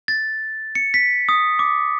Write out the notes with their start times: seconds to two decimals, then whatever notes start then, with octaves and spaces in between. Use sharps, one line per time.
0.08 A6
0.75 C#7
0.94 B6
1.29 D#6
1.59 D6